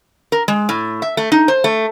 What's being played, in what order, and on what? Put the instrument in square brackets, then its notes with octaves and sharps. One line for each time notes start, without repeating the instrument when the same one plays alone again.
[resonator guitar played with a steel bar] A#4
G#3
A2
E5
A3
D#4
C5
A3